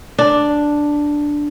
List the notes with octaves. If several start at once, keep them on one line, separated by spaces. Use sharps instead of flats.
D4